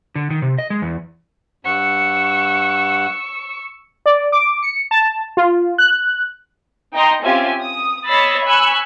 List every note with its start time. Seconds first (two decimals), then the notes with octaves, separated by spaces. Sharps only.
0.15 D3
0.30 D#3
0.42 C3
0.58 D#5
0.70 G#3
0.82 E2
1.65 G2 F#5 C#6 E6
4.06 D5
4.32 D6
4.63 C#7
4.91 A5
5.37 F4
5.78 F#6
6.94 D#4 D#5 G5 A#5 C6
7.23 C4 C#4 F4 G4 E5 G#5
7.61 D#6
8.06 C#5 D#5 B5 E6 A6 C7
8.44 G#5 B5 C#6 E6 F#6